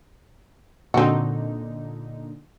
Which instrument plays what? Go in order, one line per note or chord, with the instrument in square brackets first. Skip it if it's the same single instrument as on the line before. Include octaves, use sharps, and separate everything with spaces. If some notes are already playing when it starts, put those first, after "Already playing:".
[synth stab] A#2 D3 D#4 [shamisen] C4 F#4